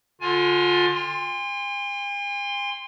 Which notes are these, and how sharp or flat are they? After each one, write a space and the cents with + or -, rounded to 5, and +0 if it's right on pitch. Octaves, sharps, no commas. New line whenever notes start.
D3 +0 F4 +20 G#5 +20
G#5 -45 C6 +0